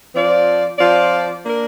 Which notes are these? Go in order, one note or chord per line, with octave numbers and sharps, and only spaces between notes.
F3 C4 F4 D5
F3 C4 F4 D5
A#3 D4 A#4